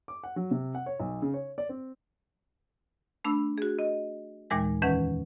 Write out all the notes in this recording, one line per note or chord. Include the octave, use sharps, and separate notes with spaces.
D6
F#5
F#3
C3
F#5
C#5
B1
C#3
C#5
D5
C4
A3 D4 B5 E6
F#4 G#4
D#5
D#2 A#2 E3 G#3 A#6
F2 D#3 E3 C#4 B4 F#5